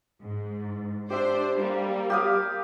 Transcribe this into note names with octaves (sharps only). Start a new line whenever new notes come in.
G#2
D4 G4 C5 E5
G3 A#3
G4 F5 D#6